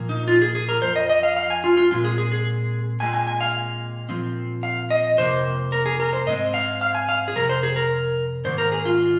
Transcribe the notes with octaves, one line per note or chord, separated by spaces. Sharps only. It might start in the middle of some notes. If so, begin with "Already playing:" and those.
Already playing: A#2 F3 A#3
D#4
F4
G#4
G#4
A#4
F2 F3 C5
D#5
D#5
F5
F5
G#5
F4
F4
A#2 G#3 C4 F4
G#4
G#4
G#4
A#2 G#3 C4 G#5
G#5
G#5
F5
A#2 F3 C4
F5
D#5
F2 C3 A#3 C5
A#4
G#4
A#4
C5
G#2 G#3 C4 D#5
F5
F5
G#5
F5
G#4
F2 C3 A#4
C5
G#4
A#4
G#2 D#3 A#3 C5
A#4
G#4
F4